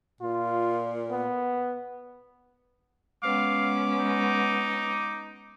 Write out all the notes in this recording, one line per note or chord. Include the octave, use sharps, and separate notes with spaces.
A#2 F4
B3
G#3 B3 C#4 F5 D6
D#4